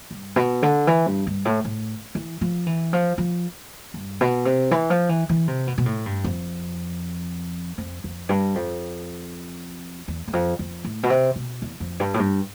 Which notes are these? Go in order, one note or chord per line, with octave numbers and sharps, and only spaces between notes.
G2
B2
D3
E3
G2
G2
A2
A2
E3
F3
E3
F3
F3
G2
B2
C3
E3
F3
E3
E3
C3
B2
B2
A2
G2
F2
F2
F2
G2
F2
E2
E2
F2
F2
A2
B2
C3
B2
E2
F2
G2
A2
G2